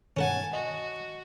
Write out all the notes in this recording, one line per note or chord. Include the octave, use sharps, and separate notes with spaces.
G2 B2 D#3 C#4 A#4 F#5 G#5 A5
F#4 D#5